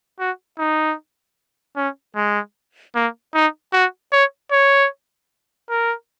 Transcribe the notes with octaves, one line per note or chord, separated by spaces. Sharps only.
F#4
D#4
C#4
G#3
A#3
D#4
F#4
C#5
C#5
A#4